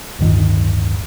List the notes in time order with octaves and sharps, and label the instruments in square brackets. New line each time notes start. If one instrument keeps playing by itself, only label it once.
[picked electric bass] D1 G1 D#3